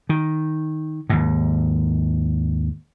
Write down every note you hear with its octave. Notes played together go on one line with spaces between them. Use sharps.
D#3
D#2 G#2